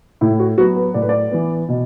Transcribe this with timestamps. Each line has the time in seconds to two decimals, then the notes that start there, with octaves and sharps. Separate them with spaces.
0.21 A2 E4
0.39 F#4
0.58 F#3 B3 F#4
0.77 B4
0.94 A2 D5
1.02 B4
1.09 D5
1.31 E3 B3
1.69 B2